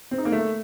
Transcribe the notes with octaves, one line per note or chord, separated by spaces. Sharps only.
C4
D#4
A#3
A3